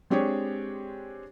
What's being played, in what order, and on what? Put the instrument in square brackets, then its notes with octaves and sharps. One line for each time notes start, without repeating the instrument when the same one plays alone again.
[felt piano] G#3 C4 D4 G4 G#4 C#5